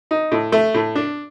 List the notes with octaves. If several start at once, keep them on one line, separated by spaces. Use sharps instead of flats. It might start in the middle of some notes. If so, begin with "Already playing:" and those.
D#4
A2
A3
A2
D4